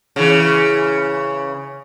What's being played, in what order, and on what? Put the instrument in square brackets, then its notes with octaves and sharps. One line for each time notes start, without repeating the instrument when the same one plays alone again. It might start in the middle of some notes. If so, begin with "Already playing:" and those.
[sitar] C#3 E3